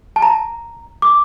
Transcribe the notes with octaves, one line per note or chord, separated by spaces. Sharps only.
A5
A#5
D6